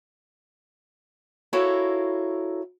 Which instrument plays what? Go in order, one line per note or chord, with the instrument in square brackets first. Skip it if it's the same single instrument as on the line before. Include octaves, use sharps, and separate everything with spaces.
[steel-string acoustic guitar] E4 F#4 A4 A#4 C#5 F5